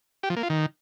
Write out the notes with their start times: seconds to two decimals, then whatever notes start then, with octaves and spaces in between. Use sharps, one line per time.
0.23 G4
0.30 F3
0.36 A#3
0.43 F4
0.50 D#3